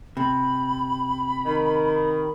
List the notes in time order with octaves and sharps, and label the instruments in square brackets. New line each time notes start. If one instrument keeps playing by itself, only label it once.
[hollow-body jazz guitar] C3 [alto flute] B5
[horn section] D#3